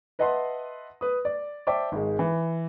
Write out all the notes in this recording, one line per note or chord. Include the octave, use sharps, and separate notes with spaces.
B4 D#5 E5 F#5 A5 C6
B4 D#6
D5
C5 D5 E5 G5 A5 D6
G#1 G#3
E3